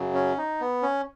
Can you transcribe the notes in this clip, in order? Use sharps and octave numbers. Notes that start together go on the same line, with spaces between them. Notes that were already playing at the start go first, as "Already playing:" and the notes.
Already playing: F#2 C#3 F#3
C#4
D#4
B3
C#4